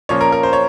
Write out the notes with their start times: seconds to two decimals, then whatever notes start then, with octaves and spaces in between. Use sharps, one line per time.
0.09 A#2 F3 A#3 C#4 C#5
0.21 A#4
0.32 A#4
0.43 C5
0.53 C#5